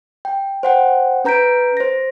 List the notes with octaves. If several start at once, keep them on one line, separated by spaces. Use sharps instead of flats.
G5
C5 F#5 G5
C#4 B4 A#5 G6 B6 D7
C5 A#6